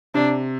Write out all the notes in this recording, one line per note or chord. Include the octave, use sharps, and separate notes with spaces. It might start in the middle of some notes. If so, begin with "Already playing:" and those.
C3 D4